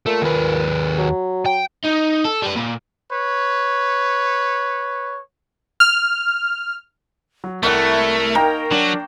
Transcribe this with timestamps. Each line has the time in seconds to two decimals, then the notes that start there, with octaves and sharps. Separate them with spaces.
0.06 A#2 A3
0.22 D#2 B4
0.98 F#3
1.46 G5
1.85 D#4
2.25 A4
2.42 G3 B4
2.56 A#2
3.12 B4 C#5
5.80 F6
7.44 F#3
7.63 C2 A3 E4 A#4 C#5 F#5
8.35 A#3 D#4 G5 A#5
8.71 F#3 D4 E7